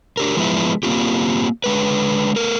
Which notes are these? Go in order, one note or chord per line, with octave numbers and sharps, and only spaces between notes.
D4 G4 A#4
F3 G#3 B3 E4
A#3 C4 F4 G4
D3 G#3 B4
A3 A#4